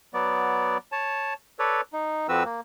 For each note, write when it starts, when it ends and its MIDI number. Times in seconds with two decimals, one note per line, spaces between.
0.14 0.78 54
0.14 0.78 59
0.14 0.78 74
0.92 1.34 73
0.92 1.34 81
1.59 1.81 69
1.59 1.81 71
1.59 1.81 73
1.59 1.81 74
1.93 2.27 63
2.29 2.43 41
2.29 2.43 53
2.29 2.43 60
2.29 2.43 66
2.29 2.43 71
2.29 2.43 88
2.45 2.61 58